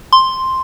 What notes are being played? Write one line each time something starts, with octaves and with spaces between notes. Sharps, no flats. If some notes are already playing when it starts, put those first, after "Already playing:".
C6